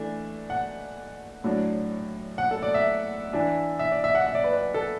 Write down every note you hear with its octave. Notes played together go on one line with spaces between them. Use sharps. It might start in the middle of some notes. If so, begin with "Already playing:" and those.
Already playing: E3 A3 D4
F#5
A2 F#3 D4
F#5
A4
D5
E5
E3 D4
E5
D5
E5
F#5
E5
D5
B4
D5
A4